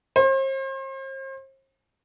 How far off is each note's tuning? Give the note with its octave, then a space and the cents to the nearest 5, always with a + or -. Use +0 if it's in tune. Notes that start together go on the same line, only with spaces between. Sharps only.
C5 +40